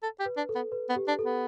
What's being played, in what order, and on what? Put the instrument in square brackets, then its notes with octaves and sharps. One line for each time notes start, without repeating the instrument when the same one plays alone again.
[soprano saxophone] A4
G4
[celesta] B4
[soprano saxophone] D4
[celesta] A4
[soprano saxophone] B3
[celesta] B4
[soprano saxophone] B3
[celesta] G4
[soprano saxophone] D4
[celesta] A4
[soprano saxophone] B3